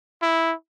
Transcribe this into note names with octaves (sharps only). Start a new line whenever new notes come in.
E4